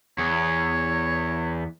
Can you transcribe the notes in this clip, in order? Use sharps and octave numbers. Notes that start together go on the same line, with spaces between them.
E2 C#5